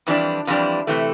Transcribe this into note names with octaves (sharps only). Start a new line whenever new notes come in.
F2 E3 G3 D4
F2 E3 G3 D4
C3 E3 A3